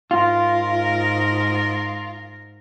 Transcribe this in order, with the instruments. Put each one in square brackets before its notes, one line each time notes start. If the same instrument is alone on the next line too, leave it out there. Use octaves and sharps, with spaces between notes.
[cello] G#2 A#4 [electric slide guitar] F4